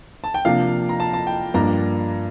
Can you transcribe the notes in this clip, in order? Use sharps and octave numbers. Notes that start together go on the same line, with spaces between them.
A5
G5
C3 F3 A#3 D4 F5
A#5
A5
A5
G5
G2 F3 A#3 D4 A#5